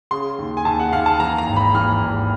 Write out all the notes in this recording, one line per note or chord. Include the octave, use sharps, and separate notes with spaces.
C#3 C6
D#2
G#5
D#2 A5
F#5
D#2 F5
A5
E3 A#5
A#5
G#1
B5
E3 F6
G#1